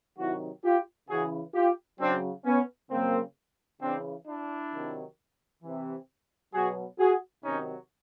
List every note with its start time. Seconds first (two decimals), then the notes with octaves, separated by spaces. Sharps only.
0.19 C3 D#3 F#3 E4 F#4
0.64 F4 G4
1.09 C#3 E3 F#4 G#4
1.55 F4 G4
2.00 C#3 F#3 C4 D4
2.45 B3 C#4
2.91 C#3 F#3 A#3 C4
3.81 C#3 E3 C4 D4
4.27 D4 E4
4.72 C3 D#3 F#3
5.63 C3 E3
6.54 B2 F#3 F#4 G#4
6.99 F#4 G#4
7.44 C3 D#3 F#3 C#4 D#4